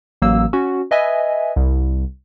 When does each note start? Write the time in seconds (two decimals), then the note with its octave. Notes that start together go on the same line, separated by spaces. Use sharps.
0.22 A1 F#3 A#3 E6
0.53 C#4 F#4
0.91 B4 D#5 E5 G#5
1.56 C2